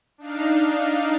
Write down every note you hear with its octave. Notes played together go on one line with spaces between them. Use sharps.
D4 D#4 F5